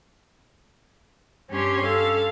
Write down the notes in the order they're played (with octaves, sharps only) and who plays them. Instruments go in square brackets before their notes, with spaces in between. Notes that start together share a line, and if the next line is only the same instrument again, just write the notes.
[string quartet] G2 C#4 G4 C#5 C6
A4 F5